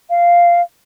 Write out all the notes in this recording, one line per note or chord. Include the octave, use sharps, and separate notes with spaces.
F5